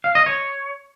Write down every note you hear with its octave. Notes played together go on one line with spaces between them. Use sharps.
F5
D#5
C#5